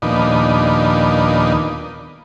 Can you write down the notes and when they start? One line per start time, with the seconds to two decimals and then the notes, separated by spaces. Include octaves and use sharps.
0.02 D#2 A#2 F3 B3 D4 D#4